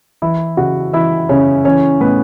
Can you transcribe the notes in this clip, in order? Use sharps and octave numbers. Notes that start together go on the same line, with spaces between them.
E3 E4 E5
C#3 F#4 F#5
E3 E4 E5
C#3 C#4 C#5
E3 C#4 C#5
A2 B3 B4